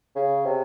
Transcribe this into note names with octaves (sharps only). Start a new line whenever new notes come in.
C#3
C3